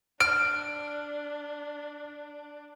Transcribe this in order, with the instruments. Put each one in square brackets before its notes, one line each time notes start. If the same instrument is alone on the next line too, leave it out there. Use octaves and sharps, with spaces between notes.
[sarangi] D4 [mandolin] F6 [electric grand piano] D7